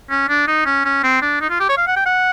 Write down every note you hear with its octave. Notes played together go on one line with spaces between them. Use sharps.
C#4
D4
D#4
C#4
C#4
C4
D4
D#4
F4
G4
C#5
F5
F#5
G5
F#5